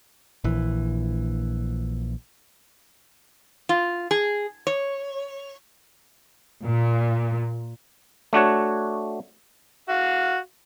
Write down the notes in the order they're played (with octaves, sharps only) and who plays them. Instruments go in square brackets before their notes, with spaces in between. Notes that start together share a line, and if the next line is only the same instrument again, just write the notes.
[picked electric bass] A#1 E3
[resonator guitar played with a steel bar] F4
G#4
C#5
[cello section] A#2
[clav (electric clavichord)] A3 D4 F#4 C#5
[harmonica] F#4 F5